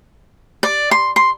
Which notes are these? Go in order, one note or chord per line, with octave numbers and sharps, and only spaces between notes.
D5
C6
C6